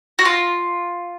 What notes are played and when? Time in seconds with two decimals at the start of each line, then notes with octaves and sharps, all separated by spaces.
0.19 F#4
0.25 F4